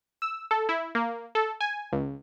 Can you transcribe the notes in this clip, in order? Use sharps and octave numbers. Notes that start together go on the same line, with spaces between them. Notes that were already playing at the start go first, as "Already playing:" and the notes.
E6
A4
E4
A#3
A4
G#5
C#2